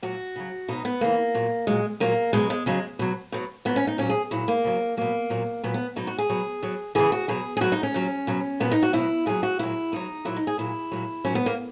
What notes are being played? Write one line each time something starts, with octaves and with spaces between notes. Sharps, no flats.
A#2 F#3 F#4
C#3 F#3
B2 F#3 D#4
B3
C#3 E3 A#3
A#2 F#3
A#2 F#3 G#3
A#2 F#3 A#3
B2 F#3 G#3
G#3
C#3 F#3 G#3
B2 F#3
B2 F#3
A#2 F#3 B3
C#4
D#4
A#2 F#3 C#4
G#4
A#2 F#3 E4
A#3
C#3 F#3
B2 F#3 A#3
A#2 F#3
A#2 F#3 B3
B3
B2 F#3 D#4
F#4
G#4
B2 F#3
B2 F#3
C#3 E3 G#4
F#4
B2 F#3 G#4
G#4
B2 F#3 F#4
D#4
C#4
A#2 F#3
B2 F#3
A#2 F#3 B3
D#4
F#4
B2 F#3 E4
A#2 F#3 G#4
F#4
A#2 F#3 E4
B2 F#3 D#4
A#2 F#3 E4
D#4
G#4
A#2 F#3 E4
A#2 F#3
A#2 F#3 C#4
B3
A#3